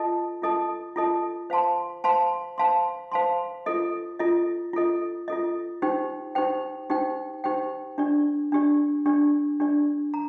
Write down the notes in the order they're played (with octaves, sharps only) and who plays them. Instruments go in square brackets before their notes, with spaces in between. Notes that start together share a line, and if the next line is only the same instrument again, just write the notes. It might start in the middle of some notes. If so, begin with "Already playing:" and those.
Already playing: [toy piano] F4 A4 D#5 A5
F4 A4 D#5 A5
F4 A4 D#5 A5
C5 F5 A5 C6
C5 F5 A5 C6
C5 F5 A5 C6
C5 F5 A5 C6
F4 A4 D#5
F4 A4 D#5
F4 A4 D#5
F4 A4 D#5
D#4 G4 C5 G5
D#4 G4 C5 G5
D#4 G4 C5 G5
D#4 G4 C5 G5
D4 G4 D5
D4 G4 D5
D4 G4 D5
D4 G4 D5
A#5